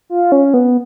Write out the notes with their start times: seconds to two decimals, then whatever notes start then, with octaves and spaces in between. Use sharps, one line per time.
0.10 F4
0.32 C#4
0.54 B3